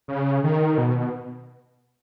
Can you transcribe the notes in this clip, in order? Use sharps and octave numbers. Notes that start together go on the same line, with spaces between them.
C#3
D#3
B2